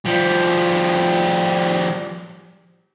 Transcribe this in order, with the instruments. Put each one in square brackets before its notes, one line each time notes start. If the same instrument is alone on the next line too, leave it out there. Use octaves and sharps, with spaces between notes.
[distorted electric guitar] F3 G3